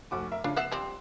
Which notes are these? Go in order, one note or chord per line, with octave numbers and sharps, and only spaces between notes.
F1 F#4 D6
A#4 E5
C#3 D4 F4
B3 E5 F#5 F#6 C7 E7
F3 G3 C4